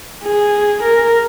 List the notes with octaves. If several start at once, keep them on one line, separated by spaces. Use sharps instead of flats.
G#4
A#4